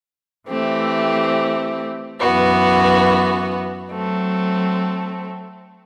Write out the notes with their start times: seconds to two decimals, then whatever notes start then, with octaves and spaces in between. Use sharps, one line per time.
0.48 E3 A3 C4 G4
2.19 F#2 E3 B3 F#4
3.90 F#3 A3 C4